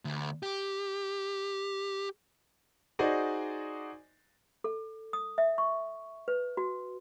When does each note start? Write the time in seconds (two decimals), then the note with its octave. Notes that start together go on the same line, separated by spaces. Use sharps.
0.05 D2
0.43 G4
2.99 D#4 F#4 G#4 C5 D5 D#5
4.64 A4
5.13 D#6
5.38 E5
5.58 C#6
6.28 B4
6.57 F#4